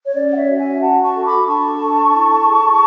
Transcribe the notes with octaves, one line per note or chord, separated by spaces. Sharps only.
C#5
C#4 D5
F#5
C#5 E5
F#4
E5 G#5
F#4 F#5 A5
A5 C#6
A4
B5 D6
D4 A5 C#6
A4
E4
G#4